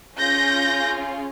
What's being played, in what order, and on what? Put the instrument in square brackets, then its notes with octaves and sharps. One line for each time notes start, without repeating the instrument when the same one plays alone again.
[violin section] C#4 F4 G#4 G6 A#6